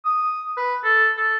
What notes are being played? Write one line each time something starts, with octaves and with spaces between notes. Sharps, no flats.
D#6
B4
A4
A4